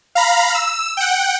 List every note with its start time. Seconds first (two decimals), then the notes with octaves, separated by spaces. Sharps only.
0.15 F5 A#5 B5
0.54 E6
0.97 F#5 G5